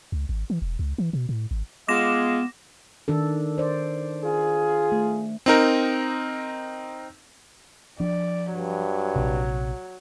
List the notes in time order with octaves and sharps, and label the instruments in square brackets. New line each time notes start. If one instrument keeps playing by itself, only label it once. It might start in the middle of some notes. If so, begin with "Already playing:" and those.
[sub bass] C#2
G#1
E3
E1
C#2
E3
B2
A2
G#1
[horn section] G#3 F4 D#5 [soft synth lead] B3 [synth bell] D6 A#6 E7
[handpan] D#3 D4 A4
C5 D5
[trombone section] F4 G#4
[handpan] A3
[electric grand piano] C4 D#4 A#4
[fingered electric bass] F3 D4 [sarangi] D5
[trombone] G2 [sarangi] F#3
[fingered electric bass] A#1 C3